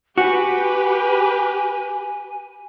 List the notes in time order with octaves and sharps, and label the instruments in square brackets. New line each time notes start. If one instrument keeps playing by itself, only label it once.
[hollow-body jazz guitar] F#4 [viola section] G4 B4 [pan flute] G#5